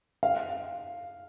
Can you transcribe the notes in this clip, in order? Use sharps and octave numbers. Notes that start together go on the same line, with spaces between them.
F5